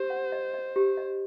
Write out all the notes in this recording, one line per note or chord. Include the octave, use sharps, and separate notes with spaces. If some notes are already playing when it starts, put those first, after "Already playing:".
Already playing: G4 C5
F#5
D#5
D#5
G4
D#5